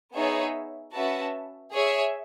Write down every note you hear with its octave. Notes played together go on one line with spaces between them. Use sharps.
B3 D#4 G#4 C#5 E5
C#4 F#4 B4 E5 A5
G#4 C#5 E5